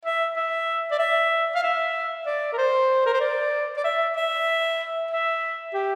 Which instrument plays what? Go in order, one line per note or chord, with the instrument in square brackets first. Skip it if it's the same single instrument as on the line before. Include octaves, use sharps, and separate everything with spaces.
[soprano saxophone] E5
E5
D5
E5
F5
E5
D5
A#4
C5
A#4
C5
D5
D5
E5
E5
E5
G4